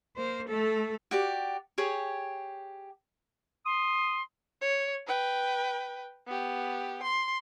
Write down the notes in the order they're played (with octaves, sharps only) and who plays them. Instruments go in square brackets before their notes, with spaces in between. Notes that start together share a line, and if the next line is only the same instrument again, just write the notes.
[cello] A#3 C5
A3 A4
[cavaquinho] F#4 G4 D5
G4 G#4 C#5
[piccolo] C6 [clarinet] D#6
[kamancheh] C#5
B4 G5
B3 G4
C6